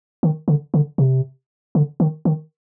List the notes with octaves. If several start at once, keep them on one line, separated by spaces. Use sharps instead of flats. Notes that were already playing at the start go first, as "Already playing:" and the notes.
D#3
D3
D3
C3
D3
D#3
D#3